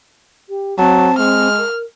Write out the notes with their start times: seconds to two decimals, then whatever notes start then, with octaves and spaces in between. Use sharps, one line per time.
0.49 G4
0.78 F#3 C4 A5
1.19 G#3 F6
1.57 A#4